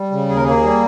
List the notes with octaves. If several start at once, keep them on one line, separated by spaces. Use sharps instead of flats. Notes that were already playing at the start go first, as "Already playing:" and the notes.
Already playing: G3
C#3
D#2 G#4
A#4
A#3 G#4
G3